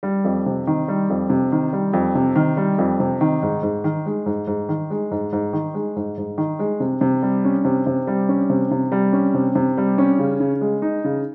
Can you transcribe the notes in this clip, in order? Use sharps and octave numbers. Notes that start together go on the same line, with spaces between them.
G3
F2
C3
D#3
G3
F2
C3
D#3
G3
F2
C3
D#3
G3
F2
C3
D#3
G#2
G#2
D#3
G#3
G#2
G#2
D#3
G#3
G#2
G#2
D#3
G#3
G#2
G#2
D#3
G#3
C3
C3
G3
C#4
C3
C3
G3
C#4
C3
C3
G3
C#4
C3
C3
G3
C#4
C#3
C#3
G#3
D#4
C#3